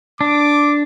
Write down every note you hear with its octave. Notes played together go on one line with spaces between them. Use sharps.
D4 D6